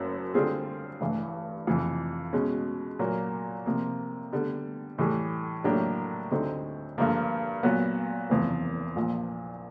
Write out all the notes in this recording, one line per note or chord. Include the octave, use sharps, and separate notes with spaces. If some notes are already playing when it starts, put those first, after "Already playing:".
Already playing: F#1 F#2 C#3 F#3
D3 G3 C4 F4 G#4
A1 G2 E3
F2 C3 E3
B2 G#3 C#4
A#2 F#3 A#3
C3 F3 A#3
D3 G3 B3
A2 E3 G3
A2 F#3 A#3 D4 G4
D2 D3 G3 C4 D#4
G2 D3 F3 A#3
A#2 F#3 B3
F#1 E2 C3 F3
A#1 A#2 F3